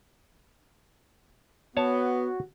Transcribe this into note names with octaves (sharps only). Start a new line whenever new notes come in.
B3 F#4 C#5 A5